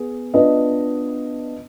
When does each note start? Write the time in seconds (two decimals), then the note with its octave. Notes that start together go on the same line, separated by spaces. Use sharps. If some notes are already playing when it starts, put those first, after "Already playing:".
Already playing: B3 G#4
0.34 B3 D4 F4 B4 D#5